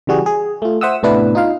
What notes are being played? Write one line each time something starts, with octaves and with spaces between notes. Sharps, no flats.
C#3 E3 G3 F#4 G#4
G#4
A3 F4
C5 E5 F#5 D#6 E6
A2 C3 B3 D4 E4 B4
D#4 F4 F5